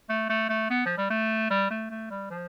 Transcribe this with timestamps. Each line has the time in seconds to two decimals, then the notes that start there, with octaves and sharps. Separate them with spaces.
0.10 A3
0.29 A3
0.49 A3
0.70 B3
0.86 F3
0.98 G3
1.10 A3
1.50 G3
1.71 A3
1.90 A3
2.11 G3
2.30 F3